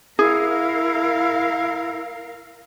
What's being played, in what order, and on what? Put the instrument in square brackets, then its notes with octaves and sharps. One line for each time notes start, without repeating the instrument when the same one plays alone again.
[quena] E4 [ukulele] G#4 [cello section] A#4 F5